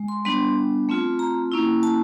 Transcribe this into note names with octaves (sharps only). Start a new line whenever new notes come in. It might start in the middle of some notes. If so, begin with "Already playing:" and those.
Already playing: G#3
C6
G3 B3 D4 C6
A3 C4 F4
A#5
A#3 C#4 E4
A5